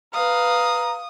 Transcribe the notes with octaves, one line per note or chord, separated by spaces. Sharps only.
B4 F5 A#5 D#6